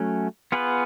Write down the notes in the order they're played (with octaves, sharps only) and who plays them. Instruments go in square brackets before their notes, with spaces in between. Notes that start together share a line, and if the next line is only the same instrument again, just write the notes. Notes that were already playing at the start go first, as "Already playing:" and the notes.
Already playing: [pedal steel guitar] F#3 A3 C#4
B3 F4 G#4 B4